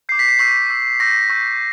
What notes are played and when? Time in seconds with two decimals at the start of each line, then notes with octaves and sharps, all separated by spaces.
0.09 G6 C7
0.12 D6
0.19 B6
0.29 C7
0.39 C#6 E6 G6 B6
0.70 C#6 E6 G6
1.00 C#6 E6 G6 A#6
1.29 C#6 E6 G6